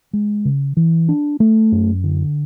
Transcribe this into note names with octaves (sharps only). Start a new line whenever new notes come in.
G#3
C#3
E3
D4
A3
F#2
D3